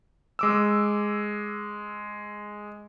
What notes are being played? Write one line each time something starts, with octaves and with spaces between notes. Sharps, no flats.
G#3 D6 E6